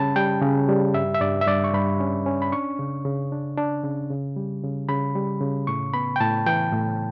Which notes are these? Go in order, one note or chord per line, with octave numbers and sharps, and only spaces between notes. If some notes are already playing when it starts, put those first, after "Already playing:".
Already playing: C#3 G3 C#4 A5 B5
G3 G5
C#3
G3
G2 E5
E5
G2 D5
E5
G2 D5
C#6
G2 B5
C#4
C#4
B5
D4 C#6
C#3
C#3
D4
D4
C#3
C#3
G3
C#3
C#3 B5
G3
C#3
A2 C#6
B3 B5
G5
A2 A5
E3 G5
A2